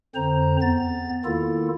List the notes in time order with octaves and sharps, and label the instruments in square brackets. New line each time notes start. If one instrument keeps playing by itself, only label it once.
[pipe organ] F2 D3 C4 C5 A#5
E2 B3 A6
D#3 A#3 E4 F4 A4